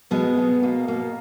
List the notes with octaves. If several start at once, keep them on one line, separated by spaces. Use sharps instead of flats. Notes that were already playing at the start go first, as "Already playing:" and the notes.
B2 G#3 B3
B2
B2 A#3
B2 A#3